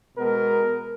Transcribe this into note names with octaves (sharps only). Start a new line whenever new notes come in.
B2 G#3 B3 A#4